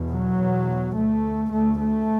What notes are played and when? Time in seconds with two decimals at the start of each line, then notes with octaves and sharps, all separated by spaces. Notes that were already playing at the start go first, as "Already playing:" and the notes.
Already playing: E2 B2
0.11 F#3
0.39 E2 B2
0.95 D2 A3
1.52 D2 A3
1.81 A3